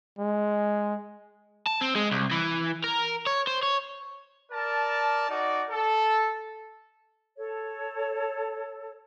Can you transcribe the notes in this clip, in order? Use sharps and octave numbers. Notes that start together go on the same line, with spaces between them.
G#3
A5
C4
G#3
C2
E3
A#4
C#5
C5
C#5
A#4 D5 A5
D#4 F#4 D5
A4
A4 C#5